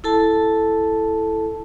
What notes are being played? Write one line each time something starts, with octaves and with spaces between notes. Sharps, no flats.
E4 A4 A5